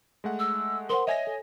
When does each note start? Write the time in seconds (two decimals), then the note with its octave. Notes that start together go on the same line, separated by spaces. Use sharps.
0.24 G#3 A3 F#5
0.39 E6
0.90 A#4 C5 F#5 C6
1.07 C#5 D#5 E5 G#5 A#6
1.27 A4